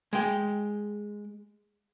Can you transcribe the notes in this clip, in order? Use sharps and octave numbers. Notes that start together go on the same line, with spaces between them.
G#3 G5